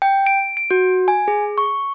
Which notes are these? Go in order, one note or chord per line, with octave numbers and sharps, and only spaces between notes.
G5
D7
D7
F#4
G#5
G#4
C#6